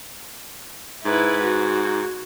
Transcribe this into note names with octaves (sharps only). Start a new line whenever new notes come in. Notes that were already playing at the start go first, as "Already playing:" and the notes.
G#2 E4 B4
F#4